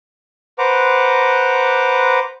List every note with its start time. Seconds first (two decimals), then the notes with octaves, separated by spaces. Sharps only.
0.59 B4 C5 F#5 A#5 D6